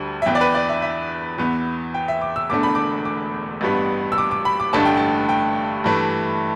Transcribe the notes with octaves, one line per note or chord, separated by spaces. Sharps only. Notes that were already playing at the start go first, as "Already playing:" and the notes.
Already playing: D2 D3 G3
E5
E2 E3 B3 G5
D5
B4
D5
E5
E5
E2 E3 B3
G5
E5
D6
E6
E1 E2 D3 A3 D6
B5
D6
D6
A1 G2 G3 B3
E6
D6
D6
B5
D6
A1 G2 D3 A3 A5
G5
A5
G5
G2 E3 A3